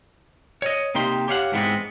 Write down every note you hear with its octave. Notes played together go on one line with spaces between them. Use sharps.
C#5 D#5
C3 A#3 D#4 G4 C6
G4 C#5 F5 F#5
G#2 E3 G3 G#3 B3 C4